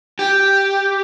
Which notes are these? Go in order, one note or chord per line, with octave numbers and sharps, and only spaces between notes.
G4